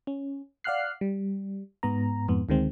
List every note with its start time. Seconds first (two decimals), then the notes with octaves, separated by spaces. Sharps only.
0.07 C#4
0.64 D5 F5 F#5 F6 F#6 C7
1.01 G3
1.83 G#2 B3 A#5
2.28 F2 G#2 B3
2.49 D2 D#3 G#3 C4